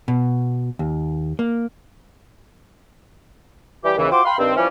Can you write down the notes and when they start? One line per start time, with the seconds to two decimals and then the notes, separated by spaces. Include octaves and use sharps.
0.08 B2
0.79 D#2
1.39 A#3
3.84 E3 G3 G4
3.97 D#2 C#3 E3
4.11 F4 F#4 C5 G5 C6 D6
4.25 F5 G5 B5 C6
4.38 G2 D#3 C4
4.56 E3 F3 G3 C#4